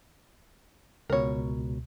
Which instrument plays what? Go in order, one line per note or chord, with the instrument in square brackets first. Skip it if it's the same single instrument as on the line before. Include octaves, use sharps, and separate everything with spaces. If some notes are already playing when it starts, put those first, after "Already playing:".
[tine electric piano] C#2 B2 [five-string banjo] A#4 C#5